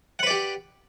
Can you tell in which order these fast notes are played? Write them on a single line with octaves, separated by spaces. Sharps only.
F#5 B4 D5 G4